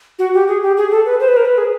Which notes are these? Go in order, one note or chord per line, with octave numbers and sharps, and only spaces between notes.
F#4
G4
G#4
G4
G#4
A4
B4
C5
B4
A#4
B4
G#4